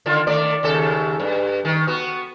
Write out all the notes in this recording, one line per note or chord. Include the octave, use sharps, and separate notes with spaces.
D3 D#3 F4
D#3 A3 D5
D#2 C#3 A4
G2
D#3
B3 F#4